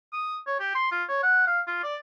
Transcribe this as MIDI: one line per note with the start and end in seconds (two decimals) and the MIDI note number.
0.12 0.36 87
0.47 0.55 73
0.60 0.72 67
0.75 0.88 84
0.91 1.03 65
1.09 1.23 73
1.23 1.45 78
1.47 1.60 77
1.67 1.81 65
1.83 1.96 74